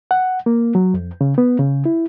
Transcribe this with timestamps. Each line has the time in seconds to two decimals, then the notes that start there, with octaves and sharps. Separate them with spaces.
0.11 F#5
0.46 A#3
0.75 F#3
0.94 F2
1.21 C#3
1.38 B3
1.59 C#3
1.86 E4